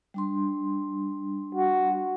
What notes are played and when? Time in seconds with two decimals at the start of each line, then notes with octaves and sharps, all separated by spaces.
0.14 G3 D4 C6
1.55 F#4